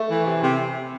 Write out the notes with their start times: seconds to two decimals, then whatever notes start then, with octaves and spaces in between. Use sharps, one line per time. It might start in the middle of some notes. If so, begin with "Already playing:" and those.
Already playing: A3
0.10 E3
0.25 C3
0.42 C3